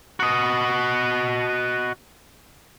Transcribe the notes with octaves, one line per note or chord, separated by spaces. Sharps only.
F#4 D#5